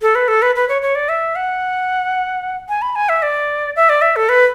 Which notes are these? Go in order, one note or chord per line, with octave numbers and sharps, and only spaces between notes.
A4
B4
A4
B4
B4
C#5
C#5
D5
E5
F#5
G#5
B5
G#5
E5
D5
E5
D5
E5
A4
B4